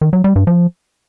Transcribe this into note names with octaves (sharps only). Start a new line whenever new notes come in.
D#3
F#3
G3
G2
F3